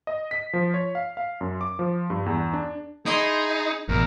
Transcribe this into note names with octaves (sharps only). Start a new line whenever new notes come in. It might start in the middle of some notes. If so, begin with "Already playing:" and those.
D#5
B6
F3
C#5
F5
F5
F#2
D6
F3
G2
E2
D4
D#4 E4 G#4 D#5 C6
A1 E2 B2 A#4